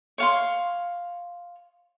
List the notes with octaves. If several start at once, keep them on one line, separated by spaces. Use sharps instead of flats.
C#5 F5 C6